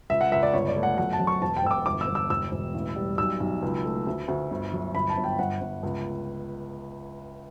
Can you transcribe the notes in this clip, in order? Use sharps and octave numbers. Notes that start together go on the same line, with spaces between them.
C#2 E5
F#5
C#2 E5
D5
G1 C#5
D5
A3
F#5
F#2 F#5
A5
F#2
C#6
E1 A5
G5
E1 E6
D6
G1 D6
E6
G1
E6
E1 E6
E1
A1
G3
B1 E6
B1
C#2
A3
D2
D2
G1
F#3
G1 B5
A5
G1
G5
G1 F#5
G1
C#2